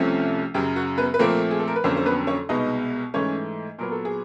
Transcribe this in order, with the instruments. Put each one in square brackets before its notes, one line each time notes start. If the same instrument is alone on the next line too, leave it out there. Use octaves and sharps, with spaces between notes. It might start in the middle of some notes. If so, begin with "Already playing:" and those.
Already playing: [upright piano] C2 C3 F3 A3 C#4
F#2 C#3 F#3 G4
F#4
B3 B4
B4
A#2 F3 A3 A#3 C4 A#4
G#4
A4
A#4
B4
F2 D3 F#3 A#3 C4 C#4 C5
C5
B3 B4
C#4 C#5
C2 B2 G#3 B3 D#4 D#5
G#2 E3 A3 C#4 C#5
A#2 F#3 B3 A#4
A4
G#4